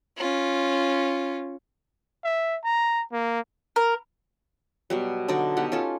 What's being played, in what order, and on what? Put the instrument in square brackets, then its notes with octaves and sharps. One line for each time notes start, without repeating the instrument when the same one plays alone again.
[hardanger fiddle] C#4 F4
[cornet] E5
A#5
A#3
[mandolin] A#4
[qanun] B2 F#3 G3
D3 F#3 D#4 D5
B2 D#4 G4 F#5
C#4 F4 A4